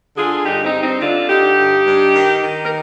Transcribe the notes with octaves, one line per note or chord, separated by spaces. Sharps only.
D3 F4 G#4
G2 D#4 G4
C4 D#4
G2
C4 D#4
D3 D4 F4
D3 D#4 G4
G2
G2
D#3
D#3
A#4